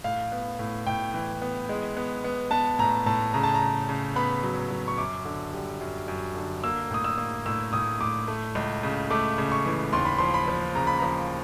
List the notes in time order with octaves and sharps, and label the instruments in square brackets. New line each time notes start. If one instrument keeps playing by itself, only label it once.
[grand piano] A2 F5
B3
A2
A2 G5
E3
B3
G#3
B3
B3
B3 A5
A2 A#5
A2 A5
C#3 A#5
A5
A#5
C#3
C#3
B3 B5
F#3
F#3
C#6
F#2 D6
D3
G3
F#2
F#2
D3
A#3 E6
A2 D#6
E6
A#3
A2 E6
A2 D#6
A2 D6
A3
C#2
C#3
A3 D6
C#3
C#6
E3
D#2 C6
B5
F3 C6
B5
F3
C#3 A#5
B5
F3 A#5